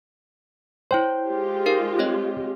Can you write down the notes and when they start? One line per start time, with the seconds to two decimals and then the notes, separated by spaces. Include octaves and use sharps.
0.91 E4 C5 C#5 G5
1.27 G#3 F4 G4
1.66 D#4 A#4 F5
1.99 C4 C#5 D#5